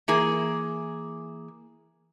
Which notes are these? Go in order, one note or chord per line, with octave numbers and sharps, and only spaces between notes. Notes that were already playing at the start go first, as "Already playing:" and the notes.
E3 A#3 G#4